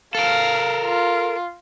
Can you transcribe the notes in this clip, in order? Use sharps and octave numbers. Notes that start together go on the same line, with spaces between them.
A4 A#4 F5
F4